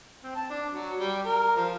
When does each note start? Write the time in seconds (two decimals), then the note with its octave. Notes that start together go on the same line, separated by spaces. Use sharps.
0.23 C4
0.35 A5
0.50 D4
0.73 F#3
0.99 G3
1.26 A#4
1.56 F3